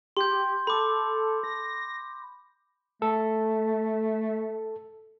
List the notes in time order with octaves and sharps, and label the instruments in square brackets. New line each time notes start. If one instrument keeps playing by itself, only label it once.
[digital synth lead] G4 [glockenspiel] C6 G6
[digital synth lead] A4 [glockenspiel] B5 D6
[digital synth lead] A#6
[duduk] A3 [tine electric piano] A4